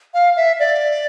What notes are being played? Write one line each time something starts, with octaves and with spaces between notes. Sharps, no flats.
F5
E5
D5